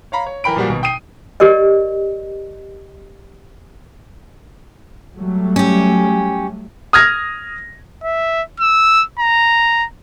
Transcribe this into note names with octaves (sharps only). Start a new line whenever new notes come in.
C#5 F5 A#5 B5
C#5
E3 A#4 G5 B5 D7
A#2 F3 G3 A#3 F#4
G#1 B2
G5 D#6 C7 D#7
G4 A#4 D5 D#5
F#3 G3 A3
C#4 G4
D#6 F6 G#6 A#6
E5
E6
A#5